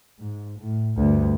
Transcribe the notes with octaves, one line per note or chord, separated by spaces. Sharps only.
G#2
A2
D2 G2